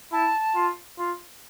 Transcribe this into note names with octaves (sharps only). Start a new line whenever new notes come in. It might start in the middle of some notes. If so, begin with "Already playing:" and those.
E4 A5
F4
F4